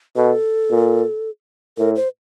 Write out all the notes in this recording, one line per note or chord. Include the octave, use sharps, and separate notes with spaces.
B2 A4
A#2
A2 A#4
C5